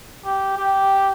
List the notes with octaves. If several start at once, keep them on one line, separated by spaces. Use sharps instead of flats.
G4
G4